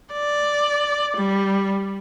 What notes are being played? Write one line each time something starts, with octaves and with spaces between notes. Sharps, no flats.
D5
G3